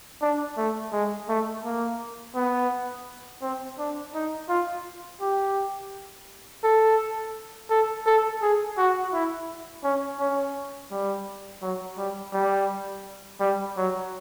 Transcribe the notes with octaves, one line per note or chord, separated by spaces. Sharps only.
D4
A3
G#3
A3
A#3
B3
C4
D4
D#4
F4
G4
A4
A4
A4
G#4
F#4
E4
C#4
C#4
G3
F#3
G3
G3
G3
F#3